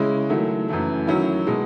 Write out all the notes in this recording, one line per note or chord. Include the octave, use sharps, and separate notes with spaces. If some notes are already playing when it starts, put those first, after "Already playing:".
Already playing: C#3 G#3 C#4 E4
D#3 F#3 A3 E4
F#2 E3 A3
D#3 F#3 C#4 E4
B2 G#3